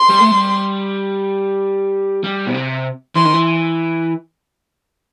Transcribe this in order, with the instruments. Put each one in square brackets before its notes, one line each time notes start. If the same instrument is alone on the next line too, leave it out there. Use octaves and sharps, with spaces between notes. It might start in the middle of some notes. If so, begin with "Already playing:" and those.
Already playing: [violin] C6
[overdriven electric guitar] G3
A3
G3
G3
B2
C3
[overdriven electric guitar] E3 [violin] C6
[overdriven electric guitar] D#3
E3